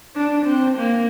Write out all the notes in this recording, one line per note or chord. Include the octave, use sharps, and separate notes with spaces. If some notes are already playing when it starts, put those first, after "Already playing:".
D4
C4
A#3